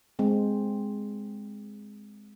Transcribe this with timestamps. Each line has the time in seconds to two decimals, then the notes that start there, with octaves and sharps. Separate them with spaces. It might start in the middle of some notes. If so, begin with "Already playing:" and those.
0.19 G#3 C4